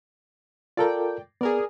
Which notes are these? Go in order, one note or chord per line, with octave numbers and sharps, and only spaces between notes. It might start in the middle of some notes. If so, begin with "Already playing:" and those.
F4 A4 A#4 D5 G5
B3 G#4 A#4 D5